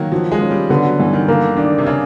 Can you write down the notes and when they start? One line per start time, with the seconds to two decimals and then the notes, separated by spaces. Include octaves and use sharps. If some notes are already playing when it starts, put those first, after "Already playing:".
Already playing: D#3 F#3 A#3
0.12 F3 F#3
0.32 G#3
0.41 C#4
0.51 G3
0.70 D3 B3
0.85 F#3
0.99 G2 E3
1.13 D#3
1.28 D3 A#3
1.57 D#3 D4
1.78 C3
1.86 C#3